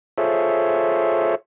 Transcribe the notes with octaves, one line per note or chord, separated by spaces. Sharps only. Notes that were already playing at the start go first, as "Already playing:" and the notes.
F4 G#4 A4 C5 C#5 E5